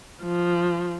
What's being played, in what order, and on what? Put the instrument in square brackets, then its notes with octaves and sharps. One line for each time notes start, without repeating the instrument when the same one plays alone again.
[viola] F3